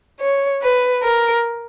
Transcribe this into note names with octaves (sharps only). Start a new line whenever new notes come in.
C#5
B4
A#4